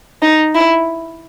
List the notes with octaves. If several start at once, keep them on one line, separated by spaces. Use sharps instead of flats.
D#4
E4